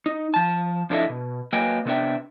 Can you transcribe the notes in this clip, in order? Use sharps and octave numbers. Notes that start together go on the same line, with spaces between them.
D#4
F3 A5
F2 D4 E4 A4 D#5 E5
B2
F#3 A#3 B4 D#5 G5 G#5
C3 A3 B3 D4 E5 G5